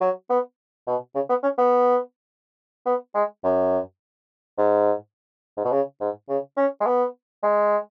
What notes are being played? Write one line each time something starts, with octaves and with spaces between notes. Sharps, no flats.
F#3
B3
B2
C#3
B3
C#4
B3
B3
G#3
F#2
G#2
G#2
B2
C#3
G#2
C#3
C#4
G#3
B3
G#3